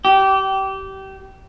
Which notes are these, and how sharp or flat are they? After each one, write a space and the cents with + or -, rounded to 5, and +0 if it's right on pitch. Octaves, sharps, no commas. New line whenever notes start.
G4 -25